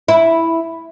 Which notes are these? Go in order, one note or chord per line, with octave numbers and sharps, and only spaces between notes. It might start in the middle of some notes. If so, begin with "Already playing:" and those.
E4